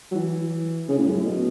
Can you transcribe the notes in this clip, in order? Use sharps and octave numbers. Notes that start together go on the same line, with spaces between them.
F#3
E3
C#3
A2
F#2
A2
B2